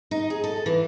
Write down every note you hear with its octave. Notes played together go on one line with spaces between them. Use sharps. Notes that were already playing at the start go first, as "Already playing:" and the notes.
D#4
G#4
A4
E3